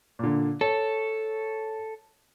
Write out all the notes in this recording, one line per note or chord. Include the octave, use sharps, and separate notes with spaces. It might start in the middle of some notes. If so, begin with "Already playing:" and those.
A#2 D3
A4 C#5